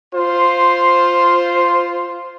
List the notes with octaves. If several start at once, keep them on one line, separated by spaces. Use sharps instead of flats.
F4 C5